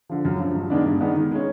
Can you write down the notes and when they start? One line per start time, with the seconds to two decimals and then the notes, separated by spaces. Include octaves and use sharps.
0.09 D3 F3
0.25 F#2
0.40 D3 F3
0.55 G2
0.70 D#3 G#3 B3 D4
0.86 G2
1.01 D#3 G#3 B3 D4
1.16 D#3
1.31 G#3 C#4